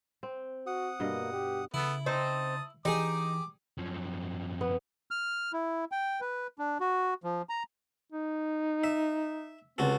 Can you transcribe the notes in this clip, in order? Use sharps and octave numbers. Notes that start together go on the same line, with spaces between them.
C4
F#4 F#5 D#6
G2 B2 A#3 D#5
G4
C#3 B3 E4 A4
C4 D#4 C5 A5 D#6
E3 D#4 G4 G#4 D6
F#2 F3
B3
F6
E4
G5
B4
D4
F#4
F3
A#5
D#4
E5
C#2 C4 F#4 A4